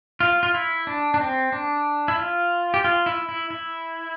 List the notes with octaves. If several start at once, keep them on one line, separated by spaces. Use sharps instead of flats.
F4
F4
E4
D4
D4
C4
D4
E4
F4
G4
F4
E4
E4
E4